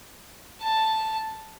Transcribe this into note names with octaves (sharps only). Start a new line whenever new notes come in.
A5